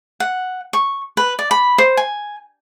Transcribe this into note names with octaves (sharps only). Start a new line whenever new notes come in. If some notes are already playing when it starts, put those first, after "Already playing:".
F#5
C#6
B4
D5
B5
C5
G#5